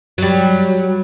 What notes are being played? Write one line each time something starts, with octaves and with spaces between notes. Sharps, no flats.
F#3 G3